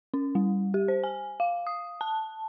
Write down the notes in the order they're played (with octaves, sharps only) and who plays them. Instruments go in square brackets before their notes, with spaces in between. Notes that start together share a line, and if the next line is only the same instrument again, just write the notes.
[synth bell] C#4
G3
G4
C5
G#5
F5
D#6
A5